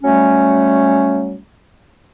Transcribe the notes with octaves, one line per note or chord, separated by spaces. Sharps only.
F#3 G3 A3 C#4